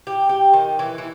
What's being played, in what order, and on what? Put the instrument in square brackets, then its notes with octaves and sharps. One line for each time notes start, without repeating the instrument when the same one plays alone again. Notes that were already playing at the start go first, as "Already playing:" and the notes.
[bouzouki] G4
G4
D#3
E3
E3